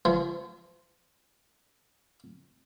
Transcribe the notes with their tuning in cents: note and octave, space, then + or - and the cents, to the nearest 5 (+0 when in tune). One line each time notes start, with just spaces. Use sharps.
F3 -40